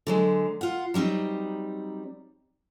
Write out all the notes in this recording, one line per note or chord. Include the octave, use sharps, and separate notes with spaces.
D3 F#3 G#3
F4 F#5
F#3 G3 C4 D#4